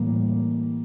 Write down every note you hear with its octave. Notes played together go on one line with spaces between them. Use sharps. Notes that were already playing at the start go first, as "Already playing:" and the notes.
Already playing: A2 E3 G3 A#3